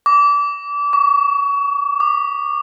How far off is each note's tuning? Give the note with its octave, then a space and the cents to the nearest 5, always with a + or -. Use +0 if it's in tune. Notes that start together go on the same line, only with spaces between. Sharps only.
D6 -30
C#6 +30
D6 +35